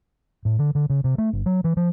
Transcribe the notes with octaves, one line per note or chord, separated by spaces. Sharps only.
A2
D3
D3
C#3
C3
A3
G1
F#3
E3
F3